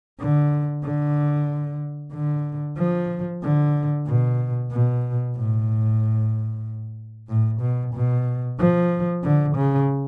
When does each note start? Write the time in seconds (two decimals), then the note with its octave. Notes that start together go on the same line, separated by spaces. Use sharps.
0.19 D3
0.83 D3
2.12 D3
2.77 F3
3.42 D3
4.06 B2
4.71 B2
5.36 A2
7.28 A2
7.61 B2
7.94 B2
8.59 F3
9.23 D3
9.56 C#3